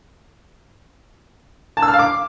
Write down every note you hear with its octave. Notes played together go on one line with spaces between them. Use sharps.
A5
E6
F6
F5
D6